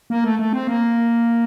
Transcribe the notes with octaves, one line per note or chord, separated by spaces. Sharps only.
A#3
A3
A3
C4
A#3